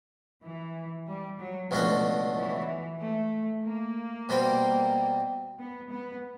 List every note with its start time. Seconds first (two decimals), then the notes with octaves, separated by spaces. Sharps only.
0.42 E3
1.07 G3
1.39 F#3
1.71 C#2 B2 F3 F#3 A3 D4
2.36 E3
3.00 A3
3.65 A#3
4.29 B2 G3 C4
5.58 B3
5.91 B3